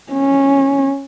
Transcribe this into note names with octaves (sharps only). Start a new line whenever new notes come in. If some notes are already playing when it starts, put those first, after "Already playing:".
C#4